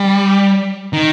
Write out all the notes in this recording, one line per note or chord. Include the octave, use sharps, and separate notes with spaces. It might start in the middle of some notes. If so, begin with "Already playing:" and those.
Already playing: G3
D#3